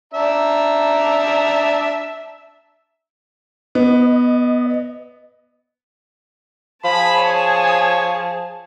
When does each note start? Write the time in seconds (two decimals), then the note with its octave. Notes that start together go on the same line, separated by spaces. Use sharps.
0.14 D4 E5 A#5
3.75 B3 D#5
6.84 F3 G#4 A5 B5
7.18 C#5